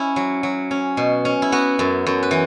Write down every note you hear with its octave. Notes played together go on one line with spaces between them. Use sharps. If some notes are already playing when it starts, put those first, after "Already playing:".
Already playing: C#4 E4
F#3
F#3
C#4
B2
C#4
E4
B3 F#4
F#2
F#2
B4
E3